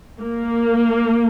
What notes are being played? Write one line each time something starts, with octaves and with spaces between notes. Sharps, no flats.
A#3